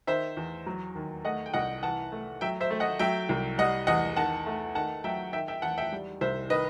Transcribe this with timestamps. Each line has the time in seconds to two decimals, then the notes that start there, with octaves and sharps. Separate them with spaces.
0.07 D#3 C5 E5
0.37 E2
0.66 F#3
0.95 D#2
1.24 A3 D#5 F#5
1.46 G5
1.54 C2 D#5 F#5
1.83 E3 F#5 A5
2.12 A3
2.41 F#3 E5 G5
2.61 C5 E5
2.70 A3
2.80 D#5 F#5
2.99 F#3 E5 G5
3.29 C2
3.58 G3 D#5 F#5
3.87 E2 D#5 F#5
4.16 D#3 F#5 A5
4.46 A3
4.75 D#3 F#5 A5
5.04 F#3 E5 G5
5.33 D#3 E5 G5
5.48 E5 G5
5.62 E2 F#5 A5
5.78 E5 G5
5.92 G3
6.21 C2 C5 E5
6.50 D#3 B4 D#5